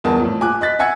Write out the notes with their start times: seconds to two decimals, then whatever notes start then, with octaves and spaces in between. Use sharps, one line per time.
0.04 G1 E2 A#4 A5
0.20 F2 A2
0.41 A#1 G#5 D6 F#6
0.61 D#5 F#6 A6 B6
0.79 E5 F#5 G#5 E6 G#6 C#7